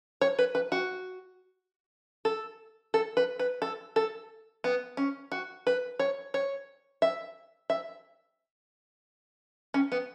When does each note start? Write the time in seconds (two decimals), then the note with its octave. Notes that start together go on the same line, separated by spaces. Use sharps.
0.21 C#5
0.39 B4
0.55 B4
0.72 F#4
2.25 A4
2.94 A4
3.17 B4
3.39 B4
3.62 A4
3.96 A4
4.64 B3
4.97 C#4
5.32 F#4
5.67 B4
5.99 C#5
6.34 C#5
7.02 E5
7.70 E5
9.74 C#4
9.92 B3